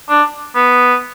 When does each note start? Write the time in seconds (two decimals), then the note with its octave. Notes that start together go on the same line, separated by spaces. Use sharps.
0.09 D4
0.55 B3